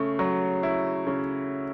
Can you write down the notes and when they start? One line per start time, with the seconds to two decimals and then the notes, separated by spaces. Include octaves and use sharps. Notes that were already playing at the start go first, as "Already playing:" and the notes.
Already playing: C#3 A3
0.19 F#3
0.63 E4
1.07 C#3